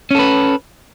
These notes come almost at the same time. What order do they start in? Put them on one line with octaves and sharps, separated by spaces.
C#4 A4 B4